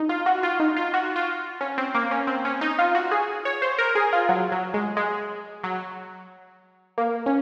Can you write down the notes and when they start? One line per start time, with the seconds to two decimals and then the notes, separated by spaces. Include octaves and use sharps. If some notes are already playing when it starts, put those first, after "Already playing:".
Already playing: D#4
0.09 F4
0.26 F#4
0.43 F4
0.60 D#4
0.76 F4
0.94 F#4
1.16 F4
1.61 C#4
1.78 C4
1.95 A#3
2.11 C#4
2.27 C4
2.45 C#4
2.61 D#4
2.79 F4
2.95 F#4
3.11 G#4
3.45 C#5
3.62 C5
3.78 A#4
3.95 G#4
4.13 F4
4.29 F#3
4.52 F#3
4.74 G#3
4.97 G#3
5.64 F#3
6.98 A#3
7.26 C#4